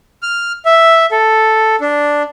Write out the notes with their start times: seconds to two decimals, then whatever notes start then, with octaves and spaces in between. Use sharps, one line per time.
0.22 F6
0.65 E5
1.11 A4
1.81 D4